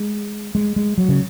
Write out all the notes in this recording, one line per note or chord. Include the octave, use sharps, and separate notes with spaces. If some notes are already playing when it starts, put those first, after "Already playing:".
Already playing: G#3
G#3
G#3
F#3
C#3